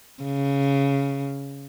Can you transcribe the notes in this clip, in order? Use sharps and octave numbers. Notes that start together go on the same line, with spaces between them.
C#3